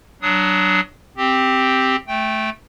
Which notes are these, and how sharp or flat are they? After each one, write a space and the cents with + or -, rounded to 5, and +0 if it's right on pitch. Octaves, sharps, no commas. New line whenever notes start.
F#3 +25 D4 +10 D#6 +25
C4 +0 G4 +0
A3 -10 G5 +0